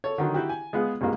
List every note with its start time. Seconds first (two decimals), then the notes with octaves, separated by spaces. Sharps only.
0.04 A4 C#5
0.18 D3 D#3 F#3
0.34 E4 F#4 G4
0.49 G#5
0.73 G#3 B3 F4 G#4
1.01 C2 G2 A#2 G#3 A#3